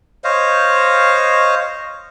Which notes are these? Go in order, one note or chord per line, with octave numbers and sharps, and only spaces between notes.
C5 C#5 D#5 F5